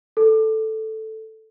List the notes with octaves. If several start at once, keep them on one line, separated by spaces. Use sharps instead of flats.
A4